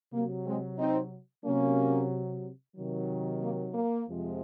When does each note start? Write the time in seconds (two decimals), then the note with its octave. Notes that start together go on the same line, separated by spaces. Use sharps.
0.13 C3 F#3 A#3
0.47 G#3 C4
0.79 C4 D#4
1.45 C3 F#3 A#3 C#4
2.76 C3 D#3 F#3
3.42 A#3
3.74 A#3
4.08 F2 C3 F3 G#3